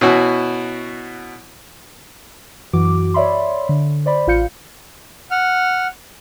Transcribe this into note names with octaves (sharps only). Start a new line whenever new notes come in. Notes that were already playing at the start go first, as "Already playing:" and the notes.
B2 C#4 E4 F#4 F#6
F#2 E3 F#4 D6
C#5 D5 E5 B5 C6
D3
C5 D5 B5
A1 F4 F5 G6 C#7
F#5 F6